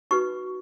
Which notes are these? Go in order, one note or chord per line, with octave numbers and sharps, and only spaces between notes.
D#4 F#4 B4 C#6